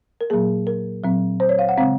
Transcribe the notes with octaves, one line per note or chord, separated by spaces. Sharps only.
A#4
A#2 F#3 A#3 G#4
A#4
A#2 F#3 C4
C5
C#5
F5
F#5
C#3 G#3 C4 F5